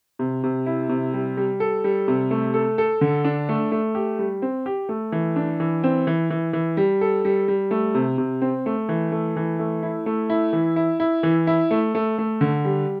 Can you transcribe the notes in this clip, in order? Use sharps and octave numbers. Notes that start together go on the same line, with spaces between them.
C3
C3
E4
C3
G3
G3
A4
G3
C3
A3
A4
A4
D3
D4
A3
A3
G4
G3
C4
G4
A3
E3
D4
E3
C4
E3
E3
E3
G3
A4
G3
G3
A3
C3
C3
C4
A3
E3
A3
E3
A3
E4
A3
E4
E3
E4
E4
E3
E4
A3
A3
A3
D3
G3